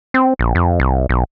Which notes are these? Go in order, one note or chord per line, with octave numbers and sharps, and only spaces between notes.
C4
A#1
F2
C2
B1